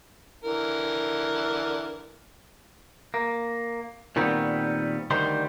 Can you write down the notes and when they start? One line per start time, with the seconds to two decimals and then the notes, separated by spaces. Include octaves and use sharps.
0.44 D3 E3 A#4
3.14 A#3
4.16 A#2 D#3 G3 B3 C4
5.11 D2 D#3 G3 C5 C6